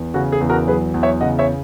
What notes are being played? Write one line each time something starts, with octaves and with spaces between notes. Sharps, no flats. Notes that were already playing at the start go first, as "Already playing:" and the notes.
Already playing: E2
C#3 F#4
G#4
E2
F#4 A#4
F#3 G#4 B4
E2
C#5 E5
C#3 D#5 F#5
C#5 E5